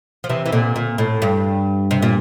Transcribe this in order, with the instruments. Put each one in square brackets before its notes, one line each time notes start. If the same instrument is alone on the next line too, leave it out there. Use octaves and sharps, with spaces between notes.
[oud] F3
C3 E3
E3
A#2 D3
A#2
A2
G2
C3
A#2